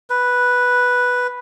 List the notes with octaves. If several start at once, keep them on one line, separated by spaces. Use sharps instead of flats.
B4